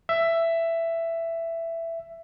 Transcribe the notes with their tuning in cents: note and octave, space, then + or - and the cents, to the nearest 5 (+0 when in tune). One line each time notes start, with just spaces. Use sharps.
E5 +10